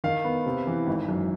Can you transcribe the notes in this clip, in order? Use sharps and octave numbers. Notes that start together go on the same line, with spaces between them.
D#3 F5
B3
C3
E3
G#1
F#2